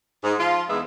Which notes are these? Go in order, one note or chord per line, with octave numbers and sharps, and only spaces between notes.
G#2
F3 F4
E2 G#2 G#3 B3 E5